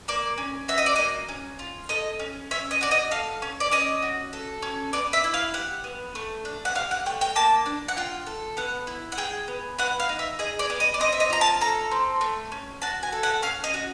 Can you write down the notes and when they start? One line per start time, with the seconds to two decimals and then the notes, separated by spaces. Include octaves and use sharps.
0.08 A#3 D5
0.38 C#4
0.68 F#4 E5
0.78 D#5
0.86 D5
0.96 A#3 D#5
1.29 C#4
1.59 F4
1.89 A4 D#5
2.19 C#4
2.51 C#4 E5
2.71 D#5
2.81 F#4 D5
2.91 D#5
3.11 A4 F5
3.42 C#4
3.60 D5
3.71 C#4 D#5
4.02 F#4
4.33 A4
4.62 C#4
4.93 B3 D5
5.13 E5
5.24 E4
5.34 F5
5.54 G4 F#5
5.84 B3
6.15 A3
6.45 D4
6.65 F#5
6.75 G4 F5
6.91 F#5
7.06 A3 G5
7.21 G5
7.36 A#3 A5
7.66 D4
7.88 F#5
7.97 F4 G5
8.27 A4
8.57 B3 F#5
8.87 E4
9.12 F#5
9.18 G#4 G5
9.48 B3
9.79 B3 F#5
10.00 F5
10.09 D#4
10.19 E5
10.39 G#4 D#5
10.59 D5
10.70 B3
10.80 D#5
10.94 D5
11.00 C4 D#5
11.12 E5
11.20 D#5
11.30 F4 A#5
11.41 A5
11.61 A4 A#5
11.91 C4
12.21 A3
12.52 C#4
12.82 F#4 A5
13.03 G#5
13.12 A4
13.23 F#5
13.42 C#4 F5
13.64 D#5
13.74 F#4